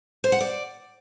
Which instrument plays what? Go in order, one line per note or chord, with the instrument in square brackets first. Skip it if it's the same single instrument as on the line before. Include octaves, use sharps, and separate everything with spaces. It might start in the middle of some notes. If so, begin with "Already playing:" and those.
[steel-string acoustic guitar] C5
F#5
D5